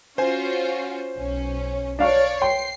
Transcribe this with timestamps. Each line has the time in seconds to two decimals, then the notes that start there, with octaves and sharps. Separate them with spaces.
0.18 C#4 F4 F#4 C5 G#5
1.15 B1 C#4
1.99 D4 C#5 D5 F5 C#6
2.42 G5 C6 C7